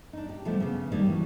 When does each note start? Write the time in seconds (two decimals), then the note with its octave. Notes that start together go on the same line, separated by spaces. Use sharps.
0.13 D4 D#4
0.29 G4
0.45 C3 F3 G3 A3 B3 D4
0.60 C#3 B3
0.92 D#3 G3 A#3 C4 D4
1.06 E3 F#3